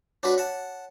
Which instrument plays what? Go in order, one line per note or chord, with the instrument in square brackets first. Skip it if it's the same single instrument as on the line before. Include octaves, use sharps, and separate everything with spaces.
[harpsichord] D4 F#4 B4 [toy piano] C#5 D6
[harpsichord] F#5 A5